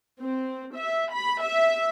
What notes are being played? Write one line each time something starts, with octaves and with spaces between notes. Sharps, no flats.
C4
E5
B5
E5